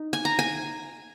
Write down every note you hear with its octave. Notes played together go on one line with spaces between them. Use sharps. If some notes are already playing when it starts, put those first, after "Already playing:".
Already playing: D#4
G#5
A#5
G#5